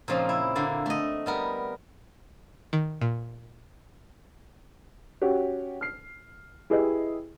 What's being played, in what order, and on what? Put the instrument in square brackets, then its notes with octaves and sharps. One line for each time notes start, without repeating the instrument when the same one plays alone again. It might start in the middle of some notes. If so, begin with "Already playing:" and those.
[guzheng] A#2 C#3 F3 C4 D#4
E4
D3 A#3 D5
A3 D#5
G3 B3 A#4
[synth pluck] D#3
A#2
[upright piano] C#4 F#4 G4
F6 C7
E4 G4 G#4 B4 D#5